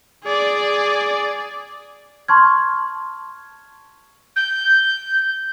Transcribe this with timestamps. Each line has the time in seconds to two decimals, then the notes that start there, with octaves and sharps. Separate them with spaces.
0.24 G#4 D5
2.28 A5 C6 C#6 F6 G#6
4.36 G6